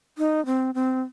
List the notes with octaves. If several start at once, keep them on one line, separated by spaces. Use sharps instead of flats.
D#4
C4
C4